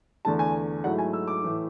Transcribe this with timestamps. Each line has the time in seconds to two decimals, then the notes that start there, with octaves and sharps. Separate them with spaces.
0.25 E2 D3 A3 A5
0.39 G#5
0.84 G#2 F#3 A3 E4 F#5
0.99 G#5
1.13 E6
1.28 D6
1.43 A2 E3 A3 E4